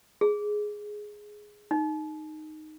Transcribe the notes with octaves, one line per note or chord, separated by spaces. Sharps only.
G#4
D#4